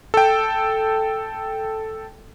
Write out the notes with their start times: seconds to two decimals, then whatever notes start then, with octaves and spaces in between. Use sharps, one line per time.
0.14 A4 G5